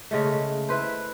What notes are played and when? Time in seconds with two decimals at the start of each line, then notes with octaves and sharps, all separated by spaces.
0.11 C#3 G#3 A3
0.69 E4 B4 C5